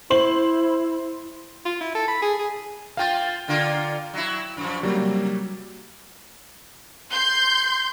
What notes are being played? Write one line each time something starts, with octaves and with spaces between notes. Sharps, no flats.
E4 C5 F#7
F4
E4
A4
B5
G#4
G#4
A#3 F4 F5 G5 A6
D3 A#3 F4
F#3 E4
F#2 F3
C3 F#3 G3 A#3
C6 G6